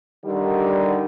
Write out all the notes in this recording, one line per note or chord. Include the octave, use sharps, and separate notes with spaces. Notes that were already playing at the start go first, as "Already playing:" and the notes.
D3 D#3 G3